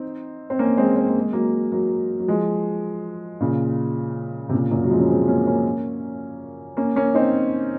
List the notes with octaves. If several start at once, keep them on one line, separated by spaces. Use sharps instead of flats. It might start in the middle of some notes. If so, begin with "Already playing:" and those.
Already playing: C4 D#4
C4
A#3 C#4
G#3 C4
C4
A#3
G#3
F#3 A#3
F#3 A#3
F#3
F3 G#3
A#2 C#3
C3
A#2 C#3
F#2 A#2
F#3
F3 G#3
C#4
G#3 C4
A#3 C#4
A#3 C#4
A#3 C#4
A#3 C#4
C4 D#4